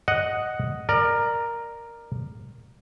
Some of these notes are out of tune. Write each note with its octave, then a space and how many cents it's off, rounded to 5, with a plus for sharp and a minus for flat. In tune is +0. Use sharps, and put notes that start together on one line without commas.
D#5 +0 F#5 +0
A#4 +0 D5 +30